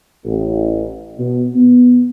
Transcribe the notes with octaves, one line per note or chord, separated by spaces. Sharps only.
A1
B2
B3